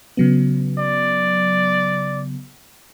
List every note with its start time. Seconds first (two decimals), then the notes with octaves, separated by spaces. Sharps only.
0.17 C#3 F#3 B3
0.78 D5